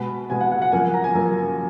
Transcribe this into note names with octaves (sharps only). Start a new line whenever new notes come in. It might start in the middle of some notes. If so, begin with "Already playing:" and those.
Already playing: B2 G#3 B3 B5
B2 G#3 B3 G#5
F#5
F#5
F#5
F#2 F3 A#3 G#5
A#5
G#5
F#2 F3 A#3